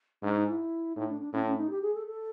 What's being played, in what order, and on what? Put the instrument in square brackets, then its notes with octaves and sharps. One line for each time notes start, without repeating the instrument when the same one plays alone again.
[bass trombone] G#2 [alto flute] D4
[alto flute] D#4
E4
[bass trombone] A2 [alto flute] D#4
[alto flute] D4
D4
[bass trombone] A2 [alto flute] C#4
[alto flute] C#4
D#4
G4
G#4
A4
A4